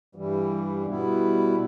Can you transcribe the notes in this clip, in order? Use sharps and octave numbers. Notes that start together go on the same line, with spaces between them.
G2 E3 G3
B2 G3 B3 E4